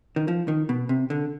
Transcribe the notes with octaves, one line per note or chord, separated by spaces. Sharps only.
D#3
F3
D#3
B2
C3
D3